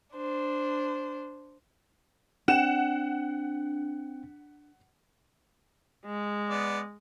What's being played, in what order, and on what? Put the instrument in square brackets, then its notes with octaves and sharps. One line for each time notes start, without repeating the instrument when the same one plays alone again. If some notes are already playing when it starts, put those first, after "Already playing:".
[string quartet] D4 C5
[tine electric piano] C4 G5 [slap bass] D4 [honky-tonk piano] F#5 E7
[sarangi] G#3
[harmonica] B3 D5